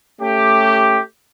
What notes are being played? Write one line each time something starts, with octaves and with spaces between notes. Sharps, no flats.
A3 C#4 G4